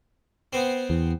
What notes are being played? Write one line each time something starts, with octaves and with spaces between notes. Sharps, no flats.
B3 C4
E2